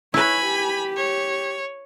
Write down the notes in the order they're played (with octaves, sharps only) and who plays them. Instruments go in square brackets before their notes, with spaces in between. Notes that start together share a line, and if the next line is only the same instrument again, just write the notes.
[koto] E4 B4 [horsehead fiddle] C#5 [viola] G#5 B5
[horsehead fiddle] G4
[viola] C#5